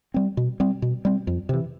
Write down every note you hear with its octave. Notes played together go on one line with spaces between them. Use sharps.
G3 C4
B2
G3 C4
B2
G3 C4
F2
C3 E3